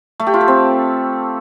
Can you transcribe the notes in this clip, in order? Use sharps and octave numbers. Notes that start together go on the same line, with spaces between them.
A3
G4
F4
A4
C4